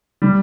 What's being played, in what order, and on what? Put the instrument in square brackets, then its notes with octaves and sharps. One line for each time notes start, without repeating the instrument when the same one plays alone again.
[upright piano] G3